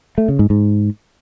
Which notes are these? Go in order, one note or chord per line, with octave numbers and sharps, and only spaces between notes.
A3
C#3
G#2
G#2